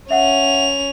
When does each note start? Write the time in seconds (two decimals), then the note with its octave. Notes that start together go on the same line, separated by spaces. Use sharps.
0.11 C#4 E5 F#5 F7